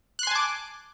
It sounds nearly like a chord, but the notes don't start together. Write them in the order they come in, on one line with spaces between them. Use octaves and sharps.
F#6 C6 G#5 A5 D6